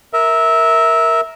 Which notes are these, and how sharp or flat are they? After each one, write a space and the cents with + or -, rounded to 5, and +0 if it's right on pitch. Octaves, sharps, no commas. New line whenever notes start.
A#4 +0 E5 -15